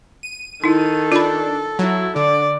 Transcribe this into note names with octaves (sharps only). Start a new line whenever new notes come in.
D#7
D#3 D#4 E4 A4
D4 F4 B5
F#3 E4
D3 D5